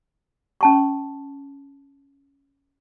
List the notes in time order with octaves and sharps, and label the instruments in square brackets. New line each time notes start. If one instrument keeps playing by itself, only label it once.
[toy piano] C#4 A5 C#6